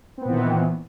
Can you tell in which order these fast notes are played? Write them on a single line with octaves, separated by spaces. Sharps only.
C4 B3 A#2 E3 D#3